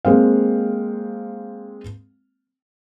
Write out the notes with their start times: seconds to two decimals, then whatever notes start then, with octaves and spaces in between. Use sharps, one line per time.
0.05 G#3 A#3 C4 F5